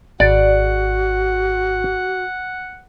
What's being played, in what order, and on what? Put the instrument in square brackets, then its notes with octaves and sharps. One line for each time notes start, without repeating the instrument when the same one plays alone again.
[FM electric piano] G#1 [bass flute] F#4 [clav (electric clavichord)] D5 [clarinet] F#5